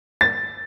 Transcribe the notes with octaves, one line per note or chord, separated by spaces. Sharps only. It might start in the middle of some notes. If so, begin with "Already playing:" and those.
A6